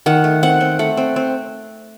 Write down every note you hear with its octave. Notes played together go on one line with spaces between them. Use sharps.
D#3 F#5
A3
C4 F#5
C4
A3 F#5
C4
C4